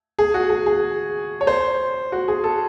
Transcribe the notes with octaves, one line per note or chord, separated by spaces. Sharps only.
G#4
F#4
G#4
G#4
C#5
C5
F#4
G#4
A4